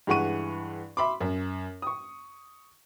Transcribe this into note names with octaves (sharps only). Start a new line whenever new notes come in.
G2 E3 G#3 F#5 C#6 D#7
E5 B5 C6 D6
F#2
C#6 D#6